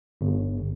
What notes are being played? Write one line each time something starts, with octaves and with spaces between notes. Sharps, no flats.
G1